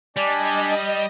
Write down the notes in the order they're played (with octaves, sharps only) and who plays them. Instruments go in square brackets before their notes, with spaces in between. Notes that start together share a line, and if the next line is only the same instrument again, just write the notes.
[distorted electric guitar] G3 [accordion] D4 D5 G#5 [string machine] D#5